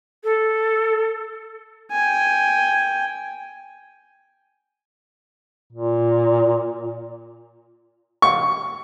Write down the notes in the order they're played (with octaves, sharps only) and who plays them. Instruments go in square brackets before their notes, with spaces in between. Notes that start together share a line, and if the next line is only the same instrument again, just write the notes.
[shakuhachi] A4
[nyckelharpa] G5 G#5
[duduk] A#2
[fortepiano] C#6